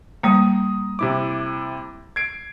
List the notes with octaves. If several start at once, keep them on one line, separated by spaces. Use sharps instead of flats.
G3 A#3 A#5 D#6
C3 E4 D6
G#6 C7 D7